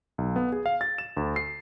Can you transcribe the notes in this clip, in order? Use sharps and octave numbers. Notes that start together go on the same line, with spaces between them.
B1
B3
G#4
F5
A6
E7
D2
C7